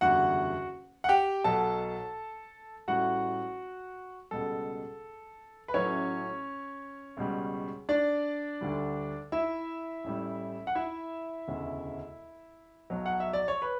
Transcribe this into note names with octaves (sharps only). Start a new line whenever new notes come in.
F#1 E2 D3 G3 F#4 F#5
F#5
G4 G5
B1 B2 F#3 A4 A5
A1 A2 G3 F#4 F#5
C#2 B2 G3 A4
B4
A1 A2 F#3 C#4 C#5
C#2 B2 G3
D4 D5
D2 D3 G3
E4 E5
A1 A2 G3
F#5
E4 E5
E1 D2 C#3
B1 B2 F#3
F#5
E5
D5
C#5
B4